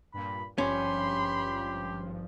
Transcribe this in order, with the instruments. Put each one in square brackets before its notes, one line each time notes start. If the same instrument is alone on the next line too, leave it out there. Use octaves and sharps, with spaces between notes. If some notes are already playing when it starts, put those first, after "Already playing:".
[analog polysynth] G2 A#2 [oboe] B5
[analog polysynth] G#1 G2 F3 [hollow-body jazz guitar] C#4 [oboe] G4 [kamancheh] B5 C6